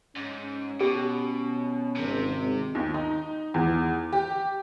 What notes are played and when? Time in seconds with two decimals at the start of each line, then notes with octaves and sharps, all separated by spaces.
0.16 G#2 C#4
0.81 B2 G4
1.96 G#1 C3
2.75 D#2
2.94 D#4
3.54 E2
4.13 G4